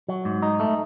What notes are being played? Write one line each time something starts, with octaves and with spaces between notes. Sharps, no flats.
F#3
G#2
D#4
A3